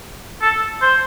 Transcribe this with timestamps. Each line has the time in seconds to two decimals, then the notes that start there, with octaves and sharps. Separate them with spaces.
0.42 A4
0.82 C5